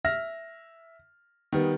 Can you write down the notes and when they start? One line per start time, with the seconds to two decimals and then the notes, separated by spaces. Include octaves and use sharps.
0.05 E5 F6 A#6
1.52 D#3 G3 B3